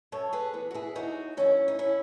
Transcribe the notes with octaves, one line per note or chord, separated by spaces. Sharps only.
F#2 A4 C#5
G#4 B4
E3 B3
F#4
E4 G#4
D#2 D#4 F#4
D#3 F#3 C#4 E4
D#4
C#4 E4